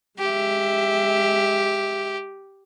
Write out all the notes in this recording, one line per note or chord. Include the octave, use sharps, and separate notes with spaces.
G#3 G4 E5